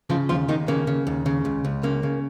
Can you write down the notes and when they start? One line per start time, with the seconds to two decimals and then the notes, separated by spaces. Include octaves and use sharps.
0.10 C#3 F3 F4
0.29 D#2 F3 F4
0.48 D#2 D#3 D#4
0.68 C#3 A#3
0.87 C#3
1.07 D#2
1.26 C#3
1.45 C#2
1.65 C#2
1.83 C#3 A#3
2.03 C#3